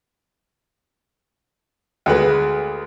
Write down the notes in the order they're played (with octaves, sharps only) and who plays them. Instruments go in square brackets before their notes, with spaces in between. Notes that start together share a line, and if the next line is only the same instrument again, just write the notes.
[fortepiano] D2 G#3 B4